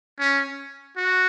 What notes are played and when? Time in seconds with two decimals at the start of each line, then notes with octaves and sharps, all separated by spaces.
0.19 C#4
0.97 F#4